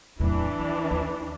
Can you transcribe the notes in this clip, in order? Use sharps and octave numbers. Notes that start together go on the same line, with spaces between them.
D1 E2 E3 D4
D#2
D#2